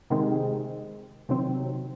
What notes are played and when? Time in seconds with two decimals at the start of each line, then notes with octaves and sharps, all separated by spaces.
0.10 C3 D#3 G#3 C4 D#4
1.29 C3 D#3 F#3 C4